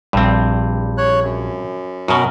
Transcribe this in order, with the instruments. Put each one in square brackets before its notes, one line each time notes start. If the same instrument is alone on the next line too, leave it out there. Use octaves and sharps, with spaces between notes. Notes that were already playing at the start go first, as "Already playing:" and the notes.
[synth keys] A#1 G3 [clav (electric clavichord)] G2 C4
[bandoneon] C#5 F#6
F#2
[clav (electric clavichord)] F#2 B2 [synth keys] F#4 [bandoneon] A#4